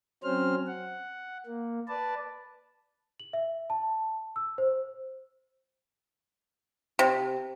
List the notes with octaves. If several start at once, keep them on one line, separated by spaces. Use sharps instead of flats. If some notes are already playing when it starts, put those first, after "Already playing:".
F#3 C4 C#4 C5 F6
F#5
A#3
B4 D5 A5
F#7
E5
A5
E6
C5
C3